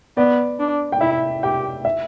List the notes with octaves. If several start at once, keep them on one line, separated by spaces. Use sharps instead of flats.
B3 D5
D4
G5
E4 E5
G4 G5
E5